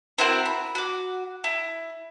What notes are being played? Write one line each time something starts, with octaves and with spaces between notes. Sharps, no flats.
C4 E4 F#4 A#4
B5
F#4 D6
E4